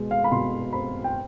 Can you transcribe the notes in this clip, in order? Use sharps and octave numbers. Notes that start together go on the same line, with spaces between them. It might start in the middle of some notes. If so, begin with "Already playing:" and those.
Already playing: B2 G#3
F5
B5
B2 C6
C4 B5
G5